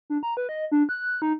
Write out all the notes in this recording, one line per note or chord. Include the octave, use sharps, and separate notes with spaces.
D4
A#5
B4
D#5
D4
F#6
D#4